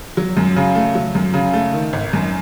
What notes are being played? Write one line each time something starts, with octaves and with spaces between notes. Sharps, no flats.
F#3
F#2
C#3
A3
F#3
F#2
C#3
A3
D#3
G#1
F#2